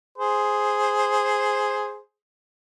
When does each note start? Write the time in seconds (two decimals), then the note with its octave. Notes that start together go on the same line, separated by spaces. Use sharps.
0.18 G#4 C5